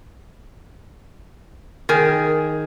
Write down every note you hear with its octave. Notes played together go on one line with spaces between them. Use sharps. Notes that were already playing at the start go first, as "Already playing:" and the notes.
D#3 G#4